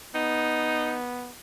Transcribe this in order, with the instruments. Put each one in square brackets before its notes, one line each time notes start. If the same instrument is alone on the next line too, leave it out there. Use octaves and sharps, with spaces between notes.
[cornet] B3 [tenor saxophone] D#4